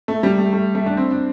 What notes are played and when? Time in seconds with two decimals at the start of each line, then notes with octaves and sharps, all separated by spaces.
0.08 A3
0.23 G3
0.38 A3
0.53 A3
0.75 A3
0.86 D4
0.97 C4
1.11 D4